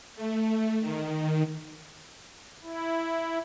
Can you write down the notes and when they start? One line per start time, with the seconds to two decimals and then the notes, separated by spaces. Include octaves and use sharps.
0.16 A3
0.80 D#3
2.63 E4